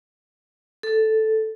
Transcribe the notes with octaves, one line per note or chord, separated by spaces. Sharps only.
A4